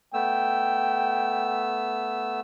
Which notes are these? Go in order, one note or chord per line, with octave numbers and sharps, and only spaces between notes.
A3 B3 G5 E6